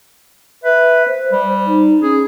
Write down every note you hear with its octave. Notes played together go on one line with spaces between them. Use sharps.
B4 E5
C5
G3
D#4
C#4 G#4